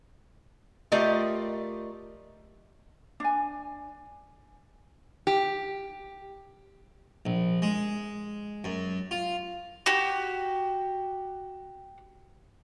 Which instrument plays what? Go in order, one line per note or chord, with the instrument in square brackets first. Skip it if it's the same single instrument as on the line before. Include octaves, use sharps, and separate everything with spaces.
[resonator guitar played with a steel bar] A3 F4 G4 A#4 D5 D#5
[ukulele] D4 G#5
[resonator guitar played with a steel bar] G4
[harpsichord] A#1
G#3
F#2
F4
[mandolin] F#4 G4